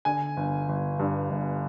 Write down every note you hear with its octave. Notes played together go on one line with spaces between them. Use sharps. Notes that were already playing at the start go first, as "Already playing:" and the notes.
D3 G#5
G1
G1
G2
G1